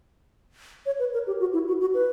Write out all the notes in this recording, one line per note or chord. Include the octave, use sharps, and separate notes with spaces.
C#5
B4
A#4
G4
F#4
E4
F#4
F#4
B4